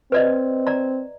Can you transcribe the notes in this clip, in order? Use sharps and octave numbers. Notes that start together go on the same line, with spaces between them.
C4 B4 D5 D#5
D5 A#5